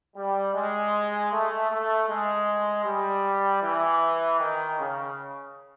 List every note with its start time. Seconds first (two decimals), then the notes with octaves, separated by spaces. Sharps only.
0.16 G3
0.54 G#3
1.31 A3
1.70 A3
2.09 G#3
2.85 G3
3.62 E3
4.39 D#3
4.79 C#3